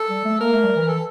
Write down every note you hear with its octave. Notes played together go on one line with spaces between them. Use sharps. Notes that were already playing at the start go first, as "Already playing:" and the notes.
Already playing: A4
G3
A3
A#3 A#4
A3
G3
E3
E3 A4